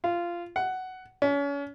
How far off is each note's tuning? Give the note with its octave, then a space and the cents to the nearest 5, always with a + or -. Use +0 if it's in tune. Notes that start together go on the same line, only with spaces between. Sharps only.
F4 -15
F#5 +10
C#4 +35